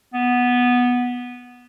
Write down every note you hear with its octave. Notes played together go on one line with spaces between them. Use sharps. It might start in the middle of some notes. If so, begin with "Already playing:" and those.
B3